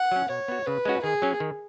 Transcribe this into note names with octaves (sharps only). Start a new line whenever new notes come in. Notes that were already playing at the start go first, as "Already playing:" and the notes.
Already playing: F#5
F#3 C#4
B2 C#5
B3 F#4
C#3 B4
G#3 C#4 F#4
D#3 G#4
F#3 C#4
D#3